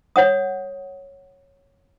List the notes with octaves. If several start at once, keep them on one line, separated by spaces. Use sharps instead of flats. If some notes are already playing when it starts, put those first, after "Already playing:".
C#5 F#5 D#6